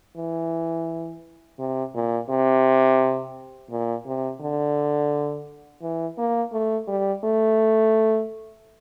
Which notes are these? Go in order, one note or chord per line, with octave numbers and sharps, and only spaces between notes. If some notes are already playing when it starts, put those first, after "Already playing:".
E3
C3
A#2
C3
A#2
C3
D3
E3
A#3
A3
G3
A3